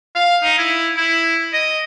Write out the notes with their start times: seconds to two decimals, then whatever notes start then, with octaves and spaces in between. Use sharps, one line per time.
0.15 F5
0.44 D#4
0.58 E4
0.97 E4
1.53 D#5